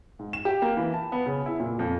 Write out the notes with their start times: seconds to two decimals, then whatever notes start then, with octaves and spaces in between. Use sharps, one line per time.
0.19 G#2
0.33 E7
0.45 G4
0.62 A#3
0.77 E3
0.94 A5
1.12 B3
1.26 C#3
1.46 E4
1.60 A#2
1.79 F2